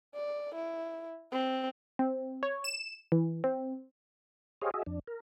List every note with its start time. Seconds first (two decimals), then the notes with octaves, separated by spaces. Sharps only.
0.15 D5
0.55 E4
1.32 C4
1.99 C4
2.43 C#5
2.64 E7
3.12 E3
3.44 C4
4.62 G4 G#4 C5 C#5 D#5 F5
4.74 F#4 G#4 D#5 E5
4.86 F2 D4
5.07 A#4